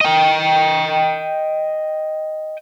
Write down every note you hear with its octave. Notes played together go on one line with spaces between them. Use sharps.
D#5 G5